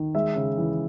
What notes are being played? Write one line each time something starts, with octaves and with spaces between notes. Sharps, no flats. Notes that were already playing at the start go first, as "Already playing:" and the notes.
Already playing: D#3
G#3 E5
C#3
E3